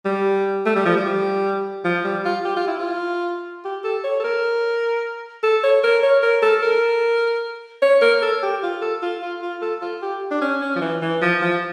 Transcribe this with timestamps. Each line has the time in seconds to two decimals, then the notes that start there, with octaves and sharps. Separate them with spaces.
0.05 G3
0.66 A3
0.76 G3
0.86 F3
0.97 G3
1.84 F3
2.04 G3
2.25 F4
2.45 G4
2.56 F4
2.67 E4
2.79 F4
3.65 G4
3.84 A4
4.04 C#5
4.20 A4
4.24 A#4
5.43 A4
5.64 C#5
5.84 A#4
6.03 C#5
6.23 A#4
6.42 A4
6.63 A#4
7.82 C#5
8.02 A#4
8.22 A4
8.43 G4
8.63 F4
8.82 A4
9.02 F4
9.22 F4
9.42 F4
9.62 A4
9.82 F4
10.02 G4
10.31 D4
10.42 C#4
10.62 C#4
10.76 F3
10.81 E3
11.02 E3
11.22 F3
11.41 F3